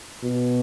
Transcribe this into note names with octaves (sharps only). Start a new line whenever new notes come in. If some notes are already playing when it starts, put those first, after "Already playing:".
B2